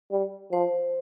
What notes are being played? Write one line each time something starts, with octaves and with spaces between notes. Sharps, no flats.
G3
F3 C5